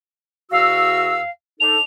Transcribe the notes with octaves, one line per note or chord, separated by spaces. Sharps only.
E2 F#4 F5 E6
D4 D#4 A4 F7